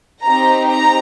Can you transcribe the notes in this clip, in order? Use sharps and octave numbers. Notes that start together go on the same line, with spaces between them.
C4 D#4 G4 A#5
A#5